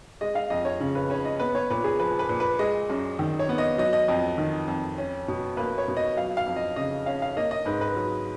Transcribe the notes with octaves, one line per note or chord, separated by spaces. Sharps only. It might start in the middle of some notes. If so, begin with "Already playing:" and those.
G#3 D#5
F5
F2 D#5
C#5
C#3
B4
C#4 C#5
D#5
B3 B4
C#5
A#2 B4
G#4
F3 B4
B4
A#2
B4
G#3 D#5
F#2
D#3
C#5
B3
D#5
F#3 D#5
D#5
F2 D#5
D#3
F2
C#4
B2
A#3 B4
C#5
B2
D#5
F#3 F5
F5
F2
D#5
C#3 D#5
C#4 F5
F5
A#3 D#5
D#5
G#2 B4
B4
F#3